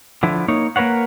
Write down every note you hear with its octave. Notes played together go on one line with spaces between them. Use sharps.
D3 F3 E4
A#3 D#4 C#5
A#3 A#4 B4 C#5 F#5